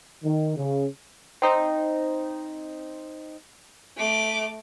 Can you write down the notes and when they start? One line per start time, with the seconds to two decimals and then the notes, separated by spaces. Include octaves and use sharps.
0.23 D#3
0.57 C#3
1.42 C4 D#4 C5
3.97 A3 D6